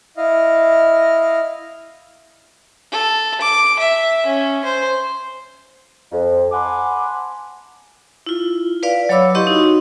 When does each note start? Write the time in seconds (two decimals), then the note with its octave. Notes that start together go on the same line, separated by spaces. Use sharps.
0.17 E4 D#5 F5
2.92 A4
3.41 D6
3.79 E5
4.26 C#4
4.64 C5
6.11 F2
6.52 F#5 G#5 A5 B5 C6 D6
8.26 E4 F4
8.83 B4 D5 F5
9.09 F#3 C#5 F5 B5 D6 E6
9.35 E4 G4 D#5 C6 C#6
9.47 D#4 F#4